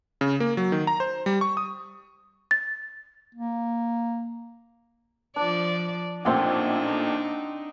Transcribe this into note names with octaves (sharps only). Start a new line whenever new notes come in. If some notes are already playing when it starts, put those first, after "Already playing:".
C#3
A#3
F#3
D#3
A#5
C5
G3
C#6
D#6
A6
A#3
F3 D4 D5
A1 A#2 A3 C4 D4 D#4 F#5